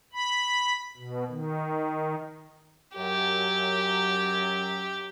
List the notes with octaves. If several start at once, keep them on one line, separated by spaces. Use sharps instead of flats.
B5
B2
D#3
F#2 F#3 G4